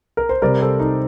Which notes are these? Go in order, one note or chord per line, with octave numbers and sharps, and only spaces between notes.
A#4
C5
C3 G3 C4 A#4 D5
A4 C5
D#4